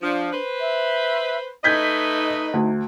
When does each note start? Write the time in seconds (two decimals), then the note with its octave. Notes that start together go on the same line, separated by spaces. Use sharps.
0.02 F3 D4
0.33 B4 C5
0.61 E5
1.64 A3 D#4 B4 D#5 G6 G#6 B6
2.53 D2